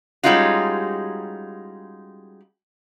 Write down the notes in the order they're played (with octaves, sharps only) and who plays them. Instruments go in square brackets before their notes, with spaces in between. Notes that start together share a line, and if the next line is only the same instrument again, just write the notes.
[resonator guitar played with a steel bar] G3 G#3 C#4 D#4 F4 F#4